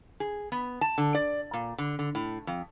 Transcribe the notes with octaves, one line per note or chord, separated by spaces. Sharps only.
G#4
B3
A5
D3
D5
A#2
D3
D3
A2
F2